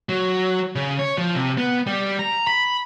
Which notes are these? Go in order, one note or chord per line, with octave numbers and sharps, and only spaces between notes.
F#3
C#3
C#5
F3
C3
B3
G3
A#5
B5